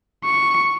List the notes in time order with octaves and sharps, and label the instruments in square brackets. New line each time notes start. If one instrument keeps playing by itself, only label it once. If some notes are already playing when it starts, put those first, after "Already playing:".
[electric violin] C#6